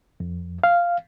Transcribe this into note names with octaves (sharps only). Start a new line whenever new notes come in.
F2
F5